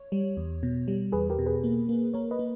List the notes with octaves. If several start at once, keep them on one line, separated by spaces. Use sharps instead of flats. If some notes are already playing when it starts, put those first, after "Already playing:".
Already playing: C#5
G3
E2
B2
G3
E2 G#4 B4
G4 A#4
B2
G#4 B4
A#3
A#3
A#3 A#4 C#5
B4 D#5
A#3